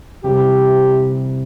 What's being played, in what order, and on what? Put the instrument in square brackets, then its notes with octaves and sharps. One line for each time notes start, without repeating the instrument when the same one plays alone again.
[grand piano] C3 E3 G3 [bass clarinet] G4